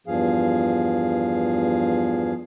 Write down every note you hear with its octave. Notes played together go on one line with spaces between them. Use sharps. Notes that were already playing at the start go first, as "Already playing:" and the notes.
E2 G2 F3 G#4 F5